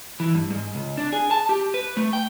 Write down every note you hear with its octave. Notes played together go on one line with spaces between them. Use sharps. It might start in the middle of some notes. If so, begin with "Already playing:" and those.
E3
G2
G#2
C#2
D4
G#4
A5
G4
B4
A3
G5